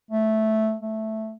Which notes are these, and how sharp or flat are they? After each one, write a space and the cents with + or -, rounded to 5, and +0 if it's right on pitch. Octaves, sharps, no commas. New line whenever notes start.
A3 -10
A3 -5